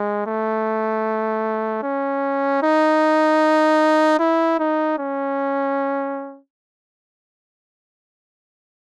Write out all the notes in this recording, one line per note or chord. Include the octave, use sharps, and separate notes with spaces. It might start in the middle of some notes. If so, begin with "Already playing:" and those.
Already playing: G#3
A3
C#4
D#4
E4
D#4
C#4